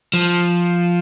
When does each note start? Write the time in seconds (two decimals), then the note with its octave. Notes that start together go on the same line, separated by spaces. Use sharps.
0.13 F3